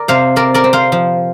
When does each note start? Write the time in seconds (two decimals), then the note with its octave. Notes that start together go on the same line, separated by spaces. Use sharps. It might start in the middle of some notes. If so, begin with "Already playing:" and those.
Already playing: A#4 D5
0.08 C3 C5 F5
0.36 C4 A#4 D5
0.54 A#4 D5
0.64 C4
0.73 C5 F5
0.92 F3